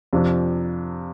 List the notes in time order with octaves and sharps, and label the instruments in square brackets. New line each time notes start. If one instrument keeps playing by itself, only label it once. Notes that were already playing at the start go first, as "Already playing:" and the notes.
[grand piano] F2 C3 F3 D4